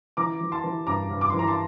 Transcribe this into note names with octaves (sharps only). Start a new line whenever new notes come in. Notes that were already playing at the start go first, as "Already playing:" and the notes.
E3 A#5 D6
E3
A5 C6
E3
G2 A#5 D6
G2
D6
C6
E3
A#5
A5 C6